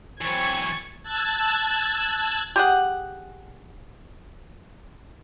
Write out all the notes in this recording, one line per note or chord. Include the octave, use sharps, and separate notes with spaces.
E3 F#3 C4 B5 C#6 G#6 A6
A5 E6 F#6 G#6 A6
G4 G#4 F#5